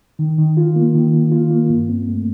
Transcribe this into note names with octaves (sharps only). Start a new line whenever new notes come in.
D#3
D#3
F4
A#3
D#3
D#3
F4
A#3
G2
C4
A3